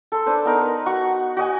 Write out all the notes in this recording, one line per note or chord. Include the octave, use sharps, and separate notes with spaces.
A4 C6
D4 B4 C5
B3 D#4 A#4 C6
B4
F#4 F#5 C#6
F#4 D#5 G#5